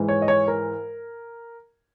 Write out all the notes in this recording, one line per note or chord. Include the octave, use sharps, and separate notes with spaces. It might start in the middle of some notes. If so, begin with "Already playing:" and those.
Already playing: G#2 E3 G#3
C#5
D#5
C#5
A#4